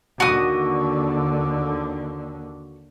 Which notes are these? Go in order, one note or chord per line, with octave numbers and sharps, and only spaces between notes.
D#2 D3 F#4 D#6